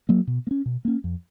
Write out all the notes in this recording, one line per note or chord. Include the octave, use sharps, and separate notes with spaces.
F#3 A#3
B2
A#3
C#4
B2
A#3 C#4
F2